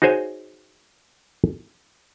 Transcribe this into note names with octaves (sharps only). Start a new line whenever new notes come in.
D#4 F#4 G#4 C5 C#5 G#5